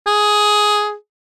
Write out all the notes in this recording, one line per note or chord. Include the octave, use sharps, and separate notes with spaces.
G#4